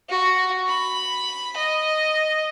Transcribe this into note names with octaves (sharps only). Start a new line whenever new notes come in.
F#4
B5
D#5